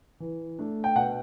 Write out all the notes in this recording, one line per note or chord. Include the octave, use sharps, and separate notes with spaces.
E3
A3 D4
G5
B2 F#5